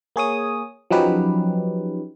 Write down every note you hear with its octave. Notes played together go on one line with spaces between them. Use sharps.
A#3 G#4 C#5 D#6
F3 F#3 C#4 D#4 G4 B4